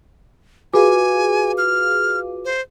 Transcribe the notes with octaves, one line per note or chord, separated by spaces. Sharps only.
F4 F#4 G#4 B4 F5 G#5 D6
F6
C5